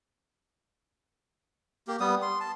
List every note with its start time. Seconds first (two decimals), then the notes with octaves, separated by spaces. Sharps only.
1.87 A#3 G4
2.00 G3 B3 D#6
2.22 C6
2.40 A5